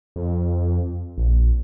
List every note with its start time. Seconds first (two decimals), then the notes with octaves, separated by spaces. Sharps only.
0.16 F2
1.18 A#1